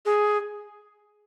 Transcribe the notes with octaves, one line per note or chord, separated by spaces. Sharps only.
G#4